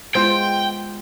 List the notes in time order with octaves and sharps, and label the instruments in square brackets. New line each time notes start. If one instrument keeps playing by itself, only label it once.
[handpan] G#3 B3 F4 [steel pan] C5 [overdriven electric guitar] G5